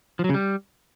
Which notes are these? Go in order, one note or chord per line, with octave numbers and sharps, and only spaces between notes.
F3
F#3
C#3
G3